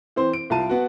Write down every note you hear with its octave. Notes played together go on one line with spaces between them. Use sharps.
E3 C4 C5
D7
C2 F4 F5 A5 D#7
B3 F#4